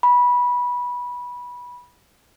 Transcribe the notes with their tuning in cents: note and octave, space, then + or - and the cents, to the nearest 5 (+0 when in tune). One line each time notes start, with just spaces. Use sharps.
B5 -15